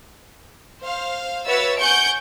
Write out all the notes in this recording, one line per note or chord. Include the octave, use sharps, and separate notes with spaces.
C5 F5
F#4 B4 C#5 E5 E6 A6
F#5 G#5 C#6 G6 C#7 D7